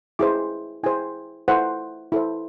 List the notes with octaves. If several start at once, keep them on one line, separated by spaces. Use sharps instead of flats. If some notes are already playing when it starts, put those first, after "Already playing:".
E4 G#4 C5 D6
E4 G#4 C5 G#5
E4 A4 C5 F#5
E4 A4 C5